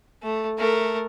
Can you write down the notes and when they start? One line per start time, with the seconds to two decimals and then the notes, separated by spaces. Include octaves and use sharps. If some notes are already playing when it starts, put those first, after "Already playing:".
0.23 A3
0.58 A3 A#4